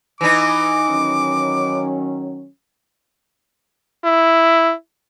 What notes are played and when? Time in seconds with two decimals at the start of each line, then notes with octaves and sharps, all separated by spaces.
0.21 E3 D#4 D6
0.89 D#3 F#3 C#4
4.05 E4